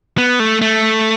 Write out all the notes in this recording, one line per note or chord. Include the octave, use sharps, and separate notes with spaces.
B3
A3
A3